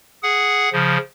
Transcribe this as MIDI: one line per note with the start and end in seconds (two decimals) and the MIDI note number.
0.23 0.69 68
0.23 0.69 78
0.72 0.97 49
0.72 0.97 53